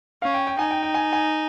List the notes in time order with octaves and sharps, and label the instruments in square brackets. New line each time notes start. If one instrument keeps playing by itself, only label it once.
[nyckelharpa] C#4 [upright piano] F5
[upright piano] G5
G5
[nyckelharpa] D#4 [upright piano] G#5
[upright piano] G5
G5
G#5
G#5